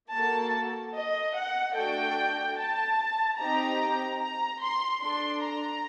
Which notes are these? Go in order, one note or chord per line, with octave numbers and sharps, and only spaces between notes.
A#3 F#4 A4 A5
D#5
F#5
A3 D4 F#4 A4 G5
A5
C4 D#4 G4 A#5
A#5
C6
D4 A4 C6
A#5